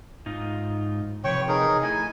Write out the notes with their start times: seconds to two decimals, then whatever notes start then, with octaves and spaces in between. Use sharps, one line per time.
0.26 G#2 D#4 F4
1.24 C3 F3 B4 C#5 G5 C#6
1.48 D#4 G#4 A#4
1.83 A3 E4 D#5 G#5